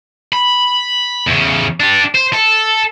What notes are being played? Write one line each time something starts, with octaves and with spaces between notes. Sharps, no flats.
B5
E2 C#3
D4 G4
C5
A4